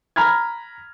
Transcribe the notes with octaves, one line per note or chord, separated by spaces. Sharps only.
A#5 B5 F6 G#6